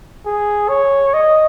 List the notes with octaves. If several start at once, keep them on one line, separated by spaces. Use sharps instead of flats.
G#4
C#5
D#5